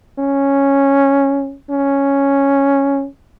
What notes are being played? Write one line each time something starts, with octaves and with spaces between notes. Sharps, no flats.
C#4
C#4